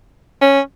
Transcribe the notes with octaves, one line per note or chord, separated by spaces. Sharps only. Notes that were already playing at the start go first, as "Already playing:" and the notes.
C#4